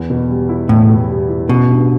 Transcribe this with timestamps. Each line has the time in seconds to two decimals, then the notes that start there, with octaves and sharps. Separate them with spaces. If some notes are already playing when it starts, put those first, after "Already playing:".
Already playing: E2
0.10 B2
0.29 G3
0.49 E4
0.69 E2 A2
0.89 B2
1.10 G3
1.29 E4
1.49 A1 B2
1.69 G2